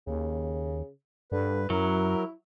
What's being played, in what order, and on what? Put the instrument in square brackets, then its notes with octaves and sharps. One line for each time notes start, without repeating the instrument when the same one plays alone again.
[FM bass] D#2 [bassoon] C#3
[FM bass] G2 [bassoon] D3 [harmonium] B4
[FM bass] F#2 [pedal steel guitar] F#3 [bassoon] E4 [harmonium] A#4